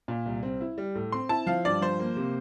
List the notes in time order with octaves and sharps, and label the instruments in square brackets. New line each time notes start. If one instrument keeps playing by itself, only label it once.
[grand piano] A#2
C2
C4
E4
G3
A2
[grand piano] C4 [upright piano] C6
[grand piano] E4 [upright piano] A5
[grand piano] F3 [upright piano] F5
[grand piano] G2 [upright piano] D5
[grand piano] F3 [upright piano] C5
[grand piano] A#3
C3